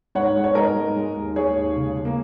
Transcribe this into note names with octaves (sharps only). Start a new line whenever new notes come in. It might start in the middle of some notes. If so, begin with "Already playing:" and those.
G#2 C#5 F#5
G#3
C#5
G#2 A#4 D#5
G#2
G#3
D#2
G#3 G#4 C#5
D#2
C#3
G#3
A#3